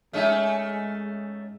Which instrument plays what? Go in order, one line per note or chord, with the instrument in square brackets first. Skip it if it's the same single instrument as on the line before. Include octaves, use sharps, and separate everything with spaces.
[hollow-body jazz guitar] G#2 E5 [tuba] G#3 [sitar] A3 C#4 D#4